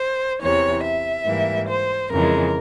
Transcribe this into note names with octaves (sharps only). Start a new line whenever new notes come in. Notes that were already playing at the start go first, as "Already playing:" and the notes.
Already playing: C5
E2 C3 E3 C#5
E5
G#2 E3 G3 A#3
C5
F2 C#3 E3 G#3 A#4